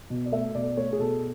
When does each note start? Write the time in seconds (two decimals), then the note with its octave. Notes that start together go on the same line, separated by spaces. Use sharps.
0.10 B2
0.26 D5
0.32 A3 E5
0.54 B2 D5
0.77 A3 C#5
0.93 G#4
0.99 B2 A4